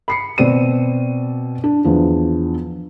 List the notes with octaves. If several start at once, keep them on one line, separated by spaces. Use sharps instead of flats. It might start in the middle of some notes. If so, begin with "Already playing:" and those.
B5 C7 C#7
B2 C4 D5 D#7
D4
E2 F3 D4